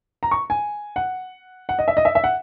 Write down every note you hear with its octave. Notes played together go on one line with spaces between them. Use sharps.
A#5
C#6
G#5
F#5
F#5
D#5
E5
D#5
E5
E5
F#5